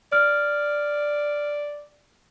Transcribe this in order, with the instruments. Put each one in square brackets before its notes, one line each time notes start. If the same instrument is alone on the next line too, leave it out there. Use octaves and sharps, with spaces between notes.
[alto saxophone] D5 [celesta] F6